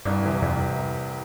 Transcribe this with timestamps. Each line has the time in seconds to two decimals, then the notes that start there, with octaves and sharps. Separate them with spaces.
0.05 C2 G2
0.24 C3 E3 G3
0.42 C2 F2